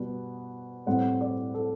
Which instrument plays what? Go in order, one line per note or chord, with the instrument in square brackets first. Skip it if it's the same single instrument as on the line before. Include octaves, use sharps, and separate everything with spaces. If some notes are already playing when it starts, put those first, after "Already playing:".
Already playing: [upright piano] B2 G3 B3
A2 G3 C4 F#5
D5
A4